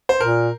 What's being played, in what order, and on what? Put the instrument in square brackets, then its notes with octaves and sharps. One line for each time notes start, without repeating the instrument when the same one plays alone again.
[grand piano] C5
[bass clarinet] A#2 [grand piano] A#4